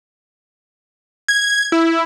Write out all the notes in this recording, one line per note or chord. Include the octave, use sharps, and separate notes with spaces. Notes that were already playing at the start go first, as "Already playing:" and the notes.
G#6
E4